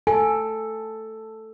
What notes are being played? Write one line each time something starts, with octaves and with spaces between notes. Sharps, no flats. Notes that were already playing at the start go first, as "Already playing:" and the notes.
A4 G#5